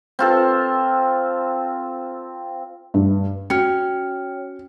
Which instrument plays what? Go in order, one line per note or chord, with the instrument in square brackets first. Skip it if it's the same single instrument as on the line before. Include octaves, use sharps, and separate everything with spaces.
[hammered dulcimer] C4 F4 A4
[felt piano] G2
[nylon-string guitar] C#4 [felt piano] F#4 C#7 [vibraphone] C#5 [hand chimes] G5 F6